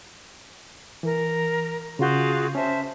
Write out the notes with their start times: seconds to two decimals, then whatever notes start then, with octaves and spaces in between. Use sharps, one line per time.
1.03 E3 A#4
1.99 C#3 F4 F#4 G#4 G6
2.55 C#4 C5 E5 A5